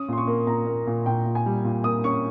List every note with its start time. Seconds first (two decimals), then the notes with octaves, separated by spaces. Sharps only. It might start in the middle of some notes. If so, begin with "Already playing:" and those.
Already playing: C#4 D#6
0.08 A#2 C6
0.18 C#6
0.28 A#3
0.47 A#2 A#5
0.67 A#3
0.87 A#2
1.06 A#2 G5
1.26 A#2
1.35 G#5
1.46 G3
1.65 A#2
1.84 A#3 D#6
2.04 C#4 C#6